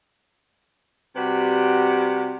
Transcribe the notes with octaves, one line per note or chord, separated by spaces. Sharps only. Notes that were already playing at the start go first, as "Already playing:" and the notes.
C3 G3 F#4 B4